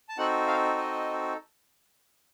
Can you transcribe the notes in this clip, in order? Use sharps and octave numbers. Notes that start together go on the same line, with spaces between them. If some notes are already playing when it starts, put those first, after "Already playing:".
A5
C4 D#4 F#4 A4 F#5
F5
D#5